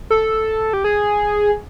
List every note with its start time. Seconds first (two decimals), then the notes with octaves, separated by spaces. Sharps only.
0.10 A4
0.73 G4
0.84 G#4